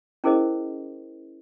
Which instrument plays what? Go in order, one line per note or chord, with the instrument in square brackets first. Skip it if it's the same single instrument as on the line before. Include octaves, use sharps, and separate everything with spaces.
[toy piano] C#4 E4 G#4 A#4 C5 D#5